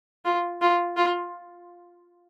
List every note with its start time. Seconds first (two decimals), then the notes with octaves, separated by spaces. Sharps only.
0.25 F4
0.61 F4
0.97 F4